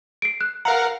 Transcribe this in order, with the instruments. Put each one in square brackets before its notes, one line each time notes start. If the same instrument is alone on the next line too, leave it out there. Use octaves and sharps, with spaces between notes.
[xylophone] C7 D7
F#6
[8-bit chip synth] A#4 F5 F#5 [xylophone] A#5